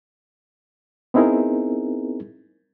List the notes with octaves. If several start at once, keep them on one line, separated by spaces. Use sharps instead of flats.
B3 C4 D#4 E4 G#4 A#4